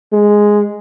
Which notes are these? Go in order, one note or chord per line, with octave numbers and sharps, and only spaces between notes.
G#3